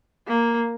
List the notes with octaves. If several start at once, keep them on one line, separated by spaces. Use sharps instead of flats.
A#3